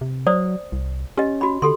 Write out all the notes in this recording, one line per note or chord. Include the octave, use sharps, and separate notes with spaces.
C3
F#3 C5 D5 D#6
C2
C#4 G4 D#5
F#4 B5
D3 G4 A4 C6